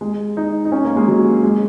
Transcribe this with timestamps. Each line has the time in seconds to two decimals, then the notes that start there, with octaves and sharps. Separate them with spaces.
0.01 G#3
0.37 D#4
0.65 D#4
0.72 C#4
0.85 A#3
0.96 G#3
1.08 F#3
1.43 G#3